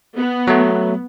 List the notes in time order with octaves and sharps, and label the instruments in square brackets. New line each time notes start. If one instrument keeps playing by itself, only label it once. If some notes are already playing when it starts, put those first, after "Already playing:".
[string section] B3
[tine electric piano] F#3 A3